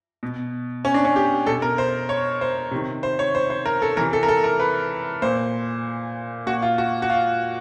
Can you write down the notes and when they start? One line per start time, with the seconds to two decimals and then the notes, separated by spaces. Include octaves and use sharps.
0.23 B2
0.85 C#4
0.94 D4
1.05 C#4
1.16 G4
1.47 B2 A4
1.62 A#4
1.78 C5
2.09 C#5
2.41 C5
2.71 C3 D#3
3.03 C5
3.19 C#5
3.35 C5
3.50 C5
3.66 A#4
3.82 A4
3.97 C3 E3 A#4
4.13 A4
4.23 A#4
4.28 A4
4.44 A#4
4.60 B4
5.22 A#2 C5
6.46 A#2 F#4
6.62 F4
6.78 F#4
7.02 F#4
7.10 F4